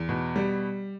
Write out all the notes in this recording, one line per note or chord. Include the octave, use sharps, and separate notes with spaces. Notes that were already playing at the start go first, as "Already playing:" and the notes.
Already playing: E2
B2
G3